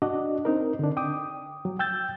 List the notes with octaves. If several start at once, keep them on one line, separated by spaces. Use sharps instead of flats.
D4 F#4 D5 D#5
C4 D#4 A#4
D3 D4
G5 D6 D#6
F#3
G5 E6 G6 A6